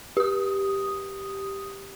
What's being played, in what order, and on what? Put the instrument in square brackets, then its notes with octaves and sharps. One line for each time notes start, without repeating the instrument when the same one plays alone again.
[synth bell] G4 D#6